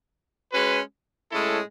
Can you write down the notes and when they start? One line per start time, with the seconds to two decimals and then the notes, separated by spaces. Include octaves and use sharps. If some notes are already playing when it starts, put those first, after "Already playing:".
0.52 G#3 C#4 F#4 B4
1.31 A2 G#3 C#4 E4 A4